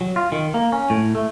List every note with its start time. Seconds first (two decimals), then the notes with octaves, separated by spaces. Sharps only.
0.01 F#3
0.16 F4
0.32 D#3
0.54 A#3
0.72 C#4
0.90 A2
1.15 A3